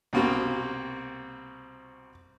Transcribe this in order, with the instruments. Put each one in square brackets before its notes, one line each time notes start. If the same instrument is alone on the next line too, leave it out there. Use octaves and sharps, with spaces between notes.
[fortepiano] C2 B2 A#3 C4 F#4